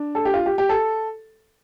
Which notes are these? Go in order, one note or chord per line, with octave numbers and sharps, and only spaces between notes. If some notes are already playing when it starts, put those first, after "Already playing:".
Already playing: D4
A4
G4
F4
G4
G4
A4